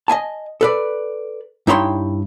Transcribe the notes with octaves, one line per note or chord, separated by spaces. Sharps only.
D#5 E5 G#5 A5
A4 B4 D5
G2 D#4 E4 C#5 G5 C6